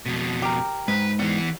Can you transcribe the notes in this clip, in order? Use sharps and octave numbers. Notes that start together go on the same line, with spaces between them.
F2 B2
G4 A#4
G#2 B4
E3 G3 B3